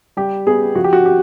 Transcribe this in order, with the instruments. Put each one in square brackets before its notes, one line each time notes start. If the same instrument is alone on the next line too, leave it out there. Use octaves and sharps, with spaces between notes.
[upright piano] G3 G4
B3 G#4
F3 F#4
G4
F#4
G4